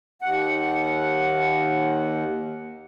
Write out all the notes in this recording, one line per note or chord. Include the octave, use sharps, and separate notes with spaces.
D#2 F#5